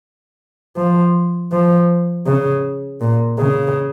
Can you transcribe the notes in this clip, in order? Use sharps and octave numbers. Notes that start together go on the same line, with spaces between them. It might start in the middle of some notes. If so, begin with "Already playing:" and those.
F3
F3
C#3
A#2
C#3